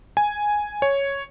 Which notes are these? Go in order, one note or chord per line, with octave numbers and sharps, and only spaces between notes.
G#5
C#5